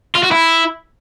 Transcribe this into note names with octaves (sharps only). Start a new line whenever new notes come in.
F4
F#4
E4